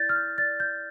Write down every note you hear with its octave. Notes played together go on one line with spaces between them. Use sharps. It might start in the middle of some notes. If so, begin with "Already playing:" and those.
Already playing: E4 D5 G6 A6
F6
G6
D5 A6
G6